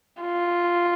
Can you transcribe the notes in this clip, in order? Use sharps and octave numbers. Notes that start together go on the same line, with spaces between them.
F4